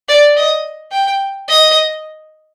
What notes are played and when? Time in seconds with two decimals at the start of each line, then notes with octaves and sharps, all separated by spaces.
0.09 D5
0.37 D#5
0.92 G5
1.48 D#5